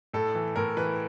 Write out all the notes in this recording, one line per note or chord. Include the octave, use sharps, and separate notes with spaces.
A2 A4
E3
A2 A#4
E3 B4